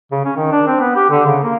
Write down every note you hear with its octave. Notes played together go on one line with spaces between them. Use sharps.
C#3
C#4
D#3
D4
C4
B3
G4
D3
C#3
A#3